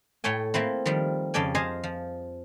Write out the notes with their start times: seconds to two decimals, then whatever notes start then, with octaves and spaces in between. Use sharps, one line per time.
0.24 A2 A3 C#5 G5 G#5
0.54 A3 A#3 C4 E4
0.86 D#3 F3 G3
1.34 F2 C#3 A4 D5 G5 G#5
1.55 G#4 C5 D#5 F5 G#5 A5
1.84 F3